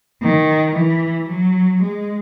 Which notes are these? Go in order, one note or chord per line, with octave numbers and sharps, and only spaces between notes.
D#3
E3
F#3
G#3